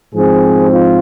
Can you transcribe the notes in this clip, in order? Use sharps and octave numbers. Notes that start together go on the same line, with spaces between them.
G#2 F3 C4 G#4
F4